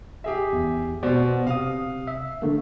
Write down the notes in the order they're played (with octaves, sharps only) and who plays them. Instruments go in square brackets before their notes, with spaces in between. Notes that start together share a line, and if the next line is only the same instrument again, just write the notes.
[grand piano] G4 G#4 E5
[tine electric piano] E2
[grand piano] B2 [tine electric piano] B3 C5 D5
[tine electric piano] C3 D#6 [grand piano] F5
[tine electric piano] E5
D3 A3 A#3